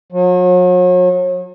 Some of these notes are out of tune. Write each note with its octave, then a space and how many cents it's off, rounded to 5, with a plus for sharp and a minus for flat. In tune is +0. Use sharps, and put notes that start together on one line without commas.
F#3 -40